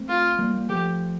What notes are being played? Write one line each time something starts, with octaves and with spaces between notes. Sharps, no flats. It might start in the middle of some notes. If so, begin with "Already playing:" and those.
Already playing: A3 C4
F4
G3 A#3
G3 A#3
F3 A3 G4